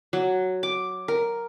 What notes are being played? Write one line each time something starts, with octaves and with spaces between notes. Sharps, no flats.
F#3
D6
A#4